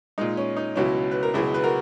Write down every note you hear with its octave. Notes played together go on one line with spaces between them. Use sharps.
A#2 G#3 D#4
C#4
D#4
C#2 B2 F#3 C#4 E4
B4
A#4
C#2 B2 F#3 E4 G#4
B4
F#4 A#4